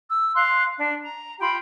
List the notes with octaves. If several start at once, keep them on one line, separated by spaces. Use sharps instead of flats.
E6
F5 C6 F#6
D4
A#5
F4 G4 G5 B5